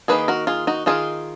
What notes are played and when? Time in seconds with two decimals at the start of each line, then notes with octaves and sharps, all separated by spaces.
0.08 D#3 A#3 D#4 G#4 B4
0.28 F#4 A#4
0.47 F4 G#4
0.67 D#4 F#4
0.86 D#3 A#3 D#4 F4 G#4